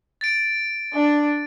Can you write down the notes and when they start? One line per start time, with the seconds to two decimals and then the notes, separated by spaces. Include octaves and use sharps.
0.21 A6 D7
0.94 D4